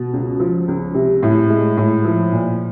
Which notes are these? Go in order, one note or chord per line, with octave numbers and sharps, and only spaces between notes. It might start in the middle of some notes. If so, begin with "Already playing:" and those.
Already playing: B2
C#2
F3
C#2
C3
A2
G#3
A2
F3
A#2